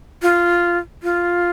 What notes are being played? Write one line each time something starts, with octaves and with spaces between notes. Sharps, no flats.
F4
F4